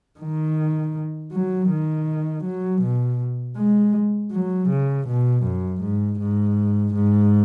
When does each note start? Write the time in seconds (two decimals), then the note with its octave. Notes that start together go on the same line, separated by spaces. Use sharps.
0.20 D#3
1.32 F#3
1.69 D#3
2.44 F#3
2.82 B2
3.56 G#3
4.32 F#3
4.69 C#3
5.07 B2
5.44 F#2
5.81 G#2
6.19 G#2
6.94 G#2